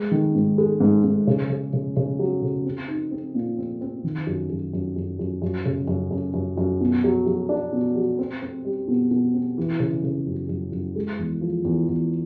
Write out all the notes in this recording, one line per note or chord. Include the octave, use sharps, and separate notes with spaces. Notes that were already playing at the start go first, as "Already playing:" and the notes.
Already playing: G#3
D#3
G#2
G#3
G#2
G#2
C#3
C#3
C#3
C#3
F#3
C#3
C4
D#4
C4
A#2
C4
C4
D#3
F#2
F#2
F#2
F#2
F#2
F#2
C#3
F#2
F#2
F#2
F#2
B2
F#3
F#3
D4
B2
F#3
C4
C4
G3
B2
B2
C4
E3
C#3
C#3
F#2
F#2
F#2
G#3
E2
F3
E2
E2